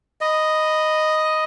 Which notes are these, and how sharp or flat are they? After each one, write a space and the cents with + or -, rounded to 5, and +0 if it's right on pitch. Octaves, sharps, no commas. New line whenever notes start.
D#5 +0 B5 +0